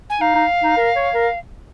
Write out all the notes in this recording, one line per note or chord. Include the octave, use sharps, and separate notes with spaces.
G#5
D#4 F5
D#4
D#4
A#4
C#5
A#4